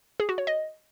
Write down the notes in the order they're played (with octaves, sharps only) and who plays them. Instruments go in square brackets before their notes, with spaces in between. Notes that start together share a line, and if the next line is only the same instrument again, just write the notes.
[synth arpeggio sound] G#4
F#4
C#5
D#5